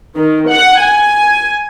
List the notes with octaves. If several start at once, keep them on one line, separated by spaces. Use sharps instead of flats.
D#3
F#5
G#5